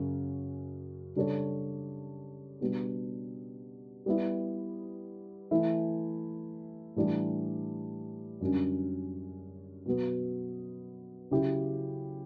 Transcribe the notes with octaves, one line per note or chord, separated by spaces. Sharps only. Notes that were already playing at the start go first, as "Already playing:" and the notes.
Already playing: F#2 C#3 F#3 C#4
C#3 G3 D4 A4 C#5
B2 G3 B3 D4
G3 B3 E4
E3 A3 E4
A2 E3 G3 D4
F#2 D3 G3 C#4
B2 F#3 B3
C#3 F#3 C#4 E4 G4